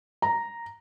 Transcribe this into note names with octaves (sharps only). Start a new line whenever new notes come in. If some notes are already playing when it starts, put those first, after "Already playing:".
A#5